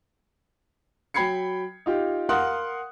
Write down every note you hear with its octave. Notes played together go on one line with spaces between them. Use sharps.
F#3 G5 B5 G#6 C7 C#7
D#4 F4 G4
A#4 F5 F#5 C6 D#6 F#6